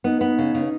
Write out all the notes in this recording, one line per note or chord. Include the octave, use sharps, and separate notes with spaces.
B3 D#4
B3
C#3
C#3